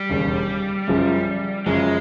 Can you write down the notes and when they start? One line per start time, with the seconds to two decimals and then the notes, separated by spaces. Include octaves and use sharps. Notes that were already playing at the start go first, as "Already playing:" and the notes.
Already playing: G3
0.09 E1 D#2 C#3
0.88 F#2 C#3 F3
1.66 F#2 C#3 F3 G#3